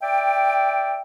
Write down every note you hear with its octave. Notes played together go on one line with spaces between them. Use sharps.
D5 E5 G5